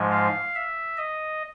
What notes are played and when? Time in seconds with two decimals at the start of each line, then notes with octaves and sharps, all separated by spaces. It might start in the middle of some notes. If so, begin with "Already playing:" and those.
Already playing: G#2 F3 G#3
0.11 F5
0.55 E5
0.97 D#5